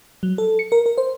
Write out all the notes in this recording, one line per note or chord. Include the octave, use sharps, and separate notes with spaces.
F#3
A4
C#7
A#4
A#4
C5